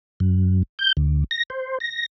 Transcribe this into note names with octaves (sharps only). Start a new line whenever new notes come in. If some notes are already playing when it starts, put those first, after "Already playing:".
F#2
G6
D2
A#6
C5
A#6